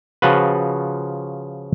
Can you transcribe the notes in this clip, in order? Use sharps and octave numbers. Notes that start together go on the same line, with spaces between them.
C#3 F3 F4 F#4 B4